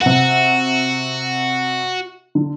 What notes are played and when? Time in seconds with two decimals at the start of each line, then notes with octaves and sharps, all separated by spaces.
0.01 C3 F#4 F#5
2.35 D3